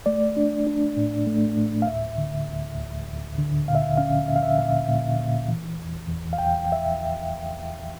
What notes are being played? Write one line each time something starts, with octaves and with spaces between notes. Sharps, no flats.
A3 D5
D4
D4
A2
A3
A2
F5
D2 E5
D3
D2
D2
D2
D3
A#2 F5
E5
F5
C#4 F5
A#2 E5
F5
E5
A#2 F5
A#2
A#2
E3
E2
E2
F5
E2 G5
E5